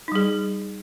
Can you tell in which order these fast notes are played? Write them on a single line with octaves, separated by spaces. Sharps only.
D#4 G3 G#4